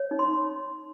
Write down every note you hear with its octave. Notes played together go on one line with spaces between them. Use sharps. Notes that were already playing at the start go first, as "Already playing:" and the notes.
Already playing: C#5
D#4
C6